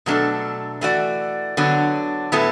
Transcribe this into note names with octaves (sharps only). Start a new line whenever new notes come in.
B2 F#3 A3 D4 A4
E3 A3 F#4 D5
D3 F#3 B3 D4
A2 F#3 B3 E4 A4